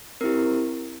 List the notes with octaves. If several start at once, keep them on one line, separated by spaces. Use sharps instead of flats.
C4 E4 G4 A#4